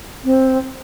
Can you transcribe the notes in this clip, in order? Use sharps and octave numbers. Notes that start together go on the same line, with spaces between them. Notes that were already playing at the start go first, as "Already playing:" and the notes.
C4